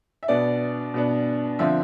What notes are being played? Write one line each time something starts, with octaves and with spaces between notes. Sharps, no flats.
E5
B2 B3 D4 D5
B2 B3 D4
D3 F3 C4 E5